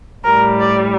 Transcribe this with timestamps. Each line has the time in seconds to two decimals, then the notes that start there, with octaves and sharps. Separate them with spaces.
0.24 A2 G3 A#4
0.59 D5